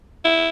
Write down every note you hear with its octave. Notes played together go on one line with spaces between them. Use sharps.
E4